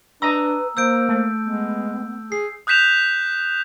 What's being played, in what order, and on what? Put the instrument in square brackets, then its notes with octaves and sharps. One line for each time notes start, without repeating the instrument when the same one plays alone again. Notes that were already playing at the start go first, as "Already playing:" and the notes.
[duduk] D4 [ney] B4 [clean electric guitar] D#5 A#5 [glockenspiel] E6
[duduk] A#3 [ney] C5 [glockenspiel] E6 G6 D7
[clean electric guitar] A3
[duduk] G#3 [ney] B3
[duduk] G#4 [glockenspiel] C7
[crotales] D#6 F#6 G6 B6 E7 F7